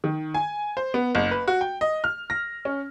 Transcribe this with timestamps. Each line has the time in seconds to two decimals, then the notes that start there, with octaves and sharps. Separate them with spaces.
0.04 D#3
0.34 G#5
0.77 C5
0.94 B3
1.15 F#1
1.31 B4
1.48 F#4
1.61 G5
1.81 D#5
2.04 F6
2.30 A#6
2.65 C#4